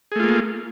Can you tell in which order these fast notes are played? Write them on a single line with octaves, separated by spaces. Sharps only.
G#4 A3 F4 A#3